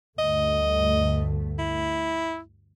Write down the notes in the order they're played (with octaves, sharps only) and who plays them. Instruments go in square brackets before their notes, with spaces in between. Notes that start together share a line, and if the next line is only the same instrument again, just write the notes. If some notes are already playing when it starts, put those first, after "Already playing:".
[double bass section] D2 G2 A3 [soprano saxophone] D#5
[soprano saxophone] E4